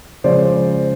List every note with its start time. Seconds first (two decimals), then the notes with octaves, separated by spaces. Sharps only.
0.24 C#3 F3 G#3 C#4 C5 D5